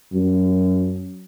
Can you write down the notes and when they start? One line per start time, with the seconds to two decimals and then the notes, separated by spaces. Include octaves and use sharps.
0.14 F#2